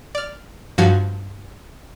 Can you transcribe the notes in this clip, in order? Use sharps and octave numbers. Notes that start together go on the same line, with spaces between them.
D5 F6
G2 F3 F#4 F5 G#6 C7